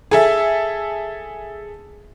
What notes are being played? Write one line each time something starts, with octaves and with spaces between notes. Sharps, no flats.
G#4 A4 E5